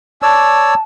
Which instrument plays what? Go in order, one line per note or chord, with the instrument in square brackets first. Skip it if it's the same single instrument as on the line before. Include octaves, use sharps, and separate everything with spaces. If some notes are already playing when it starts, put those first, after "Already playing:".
[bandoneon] C#5 D5 E6 [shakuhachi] A5